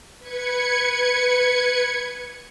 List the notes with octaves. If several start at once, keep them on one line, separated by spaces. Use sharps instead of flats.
B4 G#6 C#7